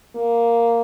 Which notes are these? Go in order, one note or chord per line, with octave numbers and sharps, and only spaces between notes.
A#3